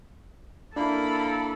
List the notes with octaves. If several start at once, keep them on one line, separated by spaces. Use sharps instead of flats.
A#3 D4 E4 A4 B5